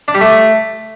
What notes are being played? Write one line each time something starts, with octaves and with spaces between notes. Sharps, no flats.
D4
G3
A3